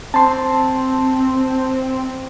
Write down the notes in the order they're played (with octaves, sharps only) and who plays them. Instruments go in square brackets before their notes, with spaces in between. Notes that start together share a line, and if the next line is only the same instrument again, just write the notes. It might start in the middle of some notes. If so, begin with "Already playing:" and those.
[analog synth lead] C4 [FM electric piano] A5 C6